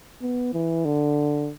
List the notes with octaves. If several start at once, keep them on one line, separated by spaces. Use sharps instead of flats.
B3
E3
D3